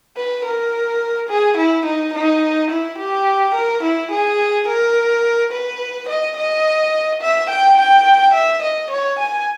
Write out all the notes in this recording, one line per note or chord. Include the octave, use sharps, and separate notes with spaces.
B4
A#4
G#4
E4
D#4
D#4
E4
G4
A#4
E4
G#4
A#4
B4
D#5
D#5
E5
G5
G5
E5
D#5
C#5
G#5